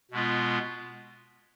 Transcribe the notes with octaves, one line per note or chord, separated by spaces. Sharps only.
B2 G#3 B3 F4